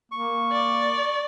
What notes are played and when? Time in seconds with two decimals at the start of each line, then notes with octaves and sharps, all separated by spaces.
0.12 A#3 C#6
0.52 D5